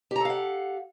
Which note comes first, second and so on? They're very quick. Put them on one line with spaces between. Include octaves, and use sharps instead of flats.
G4 A#5 A4 F5 F#5